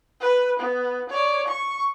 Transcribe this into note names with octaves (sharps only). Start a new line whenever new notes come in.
B4
B3
C#5 D5
C#6